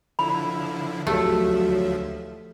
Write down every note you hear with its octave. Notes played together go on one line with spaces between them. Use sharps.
D3 F3 E4 B5
D2 F3 F#3 A3 G4 E5